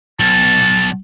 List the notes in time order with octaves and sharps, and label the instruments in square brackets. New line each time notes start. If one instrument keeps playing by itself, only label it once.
[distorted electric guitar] B1 [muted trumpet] A5